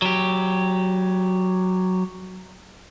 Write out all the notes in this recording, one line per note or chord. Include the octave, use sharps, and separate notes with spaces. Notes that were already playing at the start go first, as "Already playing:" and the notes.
F#3 G4